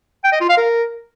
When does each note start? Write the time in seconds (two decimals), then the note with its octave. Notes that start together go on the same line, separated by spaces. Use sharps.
0.24 G5
0.32 D#5
0.41 F4
0.49 F5
0.57 A#4